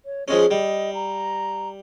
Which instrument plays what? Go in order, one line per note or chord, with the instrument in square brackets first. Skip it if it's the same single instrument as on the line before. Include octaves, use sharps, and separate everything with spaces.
[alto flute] C#5
[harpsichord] F3 G#3 C#4 [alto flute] G#4
[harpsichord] G3 [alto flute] D#5
[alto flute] A#5